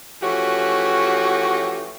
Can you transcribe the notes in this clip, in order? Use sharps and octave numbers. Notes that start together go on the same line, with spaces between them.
E3 F3 A3 C#4 F#4 G4